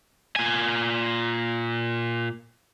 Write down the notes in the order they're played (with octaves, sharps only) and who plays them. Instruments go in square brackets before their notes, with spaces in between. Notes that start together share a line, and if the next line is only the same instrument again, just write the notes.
[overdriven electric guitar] A#2 G#5